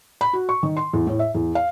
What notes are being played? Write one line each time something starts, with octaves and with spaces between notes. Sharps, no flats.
B5
F#4
C#6
D#3
C6
E2
A2
E5
E2
F5